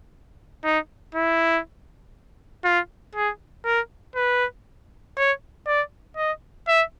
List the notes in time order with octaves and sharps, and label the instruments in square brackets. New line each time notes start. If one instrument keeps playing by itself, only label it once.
[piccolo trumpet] D#4
E4
F4
G#4
A#4
B4
C#5
D5
D#5
E5